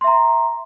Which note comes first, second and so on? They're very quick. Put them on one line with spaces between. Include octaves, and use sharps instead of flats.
C6 E5 A#5